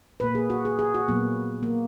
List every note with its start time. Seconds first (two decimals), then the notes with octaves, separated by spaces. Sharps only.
0.20 A#2 A#3 B4
0.35 G#4
0.50 F#4
0.65 G#4
0.79 G#4
0.94 F#4
1.08 A#2 F#3 A#3 B3
1.63 A#3